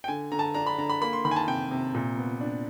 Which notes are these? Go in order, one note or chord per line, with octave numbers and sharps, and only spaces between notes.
G5
D3 G#5
D3 A#5
A5
D4 A#5
B5
D3 A#5
B5
A#3 B5
C6
D#3 B5
G#5
A5
C3 G5
C3
A#2
B3
D4